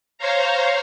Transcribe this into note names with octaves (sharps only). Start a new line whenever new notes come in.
C5 C#5 F5 A#5